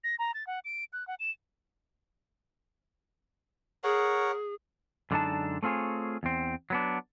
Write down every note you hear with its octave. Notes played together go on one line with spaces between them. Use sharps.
A#6
A#5
A6
F#5
D7
F#6
F#5
E7
G#4 A#4 C#5 F#5
F#2 D3 G#3 D4 D#4 A5
A3 C4 F4 G#4 C#5
E2 C4
F#3 B3 D4